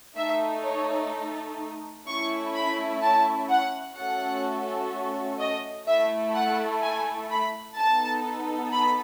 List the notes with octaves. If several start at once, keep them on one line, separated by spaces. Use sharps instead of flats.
A3 D#4 A4 E5
C#5
A3 C#4 E4 C#6
B5
A5
F#5
A3 C#4 F#4 A4 F#5
D#5
A3 E4 A4 E5
F#5
G#5
B5
B3 D#4 A4 A5
B5